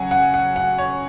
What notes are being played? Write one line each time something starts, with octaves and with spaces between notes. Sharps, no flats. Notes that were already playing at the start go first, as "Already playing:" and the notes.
Already playing: C#3 F#3 C#4 F#5 G#5
F#5
F#5
F#5
C#5